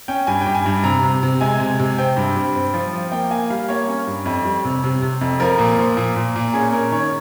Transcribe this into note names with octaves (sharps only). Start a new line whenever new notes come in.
C#4 G5
G2 G#5
G5
G2
G#5
G2
C3 A#5
C3
C3
G#3 G#5
C3
C3
C4 G5
G2
G2
C4
F3
F3
A#3 G5
A#3 G#5
G3 F5
A#3 C#5
C#4
G2
F2
G3
C3
C3
C3
F2
F3 A#4
A#2
F3
A#2
A#2
A#2
C#4 G#4
C#4 A#4
D#3 C#5